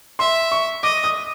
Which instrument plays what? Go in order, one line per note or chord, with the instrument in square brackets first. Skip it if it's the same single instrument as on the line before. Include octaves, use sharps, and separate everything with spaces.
[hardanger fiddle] E5 [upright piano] C6
[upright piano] C#6
[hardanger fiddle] D#5 [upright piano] D6
[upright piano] D#6